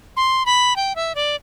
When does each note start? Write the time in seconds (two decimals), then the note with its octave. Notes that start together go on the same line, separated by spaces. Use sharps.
0.17 C6
0.46 B5
0.76 G5
0.96 E5
1.15 D5